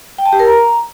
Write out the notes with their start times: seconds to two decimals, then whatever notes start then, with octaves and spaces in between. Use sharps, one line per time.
0.18 G5
0.25 A5
0.33 G4
0.40 A#4
0.47 A#5